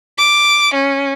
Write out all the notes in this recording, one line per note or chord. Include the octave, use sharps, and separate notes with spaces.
D6
C#4